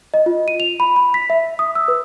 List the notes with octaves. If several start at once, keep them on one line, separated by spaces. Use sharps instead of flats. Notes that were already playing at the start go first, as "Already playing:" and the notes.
D#5
F4
D#7
F7
B5
B5
B6
E5
D#6
E6
B4